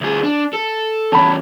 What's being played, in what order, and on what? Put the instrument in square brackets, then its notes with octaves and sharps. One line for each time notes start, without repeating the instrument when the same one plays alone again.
[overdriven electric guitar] D2 G#4
D4
A4
[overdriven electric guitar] E2 C#4 [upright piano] A5 B5